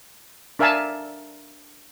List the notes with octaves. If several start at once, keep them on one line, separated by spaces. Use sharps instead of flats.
D4 A#4 E5 F5 G#5 A5